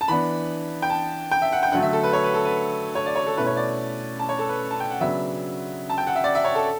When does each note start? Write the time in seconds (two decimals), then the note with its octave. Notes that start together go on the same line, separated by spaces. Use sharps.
0.01 A5
0.08 E3 B3 D4 B5
0.82 G5
0.90 A5
1.31 G5
1.42 E5
1.52 F#5
1.63 G5
1.72 D3 F#3 A3 F#5
1.82 E5
1.93 A4
2.03 B4
2.13 C#5
2.24 B4
2.34 A4
2.45 B4
2.95 C#5
3.06 D5
3.16 C#5
3.26 A4
3.37 B2 A3 C#4 E4 B4
3.46 C#5
3.57 D5
4.19 A5
4.29 C#5
4.39 A4
4.49 B4
4.71 A5
4.80 G5
4.91 F#5
5.01 C#3 F#3 B3 D4 E5
5.90 A5
5.98 G5
6.07 F#5
6.15 E5
6.24 D5
6.35 E5
6.44 C#5
6.55 A4